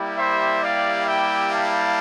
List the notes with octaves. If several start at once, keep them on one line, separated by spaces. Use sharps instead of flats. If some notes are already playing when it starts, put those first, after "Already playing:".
Already playing: G3 A#3 E4 G4
C5 E5
D5 F5
E5 G5
F5 A5